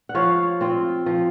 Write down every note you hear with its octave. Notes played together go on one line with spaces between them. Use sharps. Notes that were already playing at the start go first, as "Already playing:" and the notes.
F#5
F3 C#5 F5
C4 F4
F3